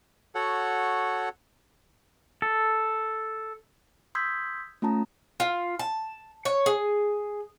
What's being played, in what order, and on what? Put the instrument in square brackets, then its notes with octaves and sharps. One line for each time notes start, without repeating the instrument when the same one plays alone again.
[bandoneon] F#4 A4 C#5 F#5
[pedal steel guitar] A4
[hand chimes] C6 D#6 E6 G6 G#6 B6
A3 C#4 F4 A5 A#5
[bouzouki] F4
A5
C#5
G#4